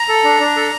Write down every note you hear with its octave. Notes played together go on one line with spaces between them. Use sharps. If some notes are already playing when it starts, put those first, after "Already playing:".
Already playing: A#5
A4
D4
D4
A4